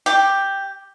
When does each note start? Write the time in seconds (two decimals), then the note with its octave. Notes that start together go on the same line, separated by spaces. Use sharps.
0.06 G4